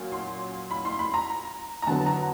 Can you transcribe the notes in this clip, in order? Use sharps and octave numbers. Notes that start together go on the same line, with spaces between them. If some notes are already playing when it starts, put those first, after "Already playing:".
Already playing: A#2 F#3 A#3 C#4
C6
B5
C6
B5
A#5
A#5
D3 F#3 B3 A5
A#5